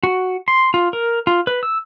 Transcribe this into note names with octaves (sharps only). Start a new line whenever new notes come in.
F#4
C6
F4
A#4
F4
B4
E6